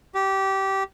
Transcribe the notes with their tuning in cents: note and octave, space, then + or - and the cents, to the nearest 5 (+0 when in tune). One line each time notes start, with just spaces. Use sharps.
G4 -20